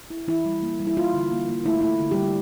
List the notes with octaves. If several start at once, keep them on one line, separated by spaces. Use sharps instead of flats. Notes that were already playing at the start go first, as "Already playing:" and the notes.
E4
E3 E4
G3
A#3
G3
E4
A#3 F4
D3
A#3
A#3
A3 E4
A3 E4
D3
G3 G4
D3